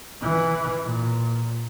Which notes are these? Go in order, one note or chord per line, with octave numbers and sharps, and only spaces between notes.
E3
A#2